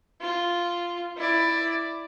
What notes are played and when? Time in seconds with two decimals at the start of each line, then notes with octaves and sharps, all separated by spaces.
0.21 F4
1.17 E4 D5